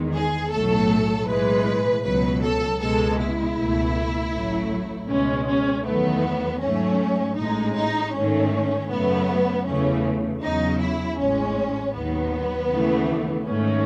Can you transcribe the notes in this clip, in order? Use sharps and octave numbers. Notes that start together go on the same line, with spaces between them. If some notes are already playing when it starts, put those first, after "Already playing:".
Already playing: E2 D#3 G#3
G#4
B1 A2 F#3 A3 A4
B1 A2 E3 G#3 B4
C#2 B2 F#3 B4
A4
C#2 B2 G#3 A4
E4
C#2 B2 A3
A1 A2 F#3 A3
C#2 B2 G#3 C#4
C#4
E2 D#3 F#3 A3 B3
G#2 F#3 A3 C#4
A1 A2 G#3 D#4
D#4
G#2 D#3 A3 C#4
F#2 C#3 F#3 A3 B3
E2 C#3 E3 A3 C#4
E2 C#3 F#3 D#4
E4
A1 A2 G#3 C#4
D#2 D#3 F#3 B3
D#2 C#3 E3 A3
G#2 D#3 A3 C#4